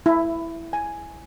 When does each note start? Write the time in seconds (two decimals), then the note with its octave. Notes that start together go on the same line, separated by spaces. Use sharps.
0.06 E4
0.73 G#5